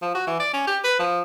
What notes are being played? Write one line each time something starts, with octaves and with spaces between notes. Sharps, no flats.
F3
F#4
E3
D5
C#4
G4
B4
F3